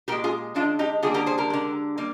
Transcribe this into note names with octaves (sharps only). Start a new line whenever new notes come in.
A#2 G#3 G4 A#4
F4 G#4
D3 G#3 D4 F4
D#4 G4
D3 G3 A#3 F4 G#4
G4 A#4
G#4 C5
G4 A#4
D3 G#3
G3 A#3